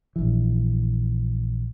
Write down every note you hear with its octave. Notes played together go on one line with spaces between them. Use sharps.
A#1 E3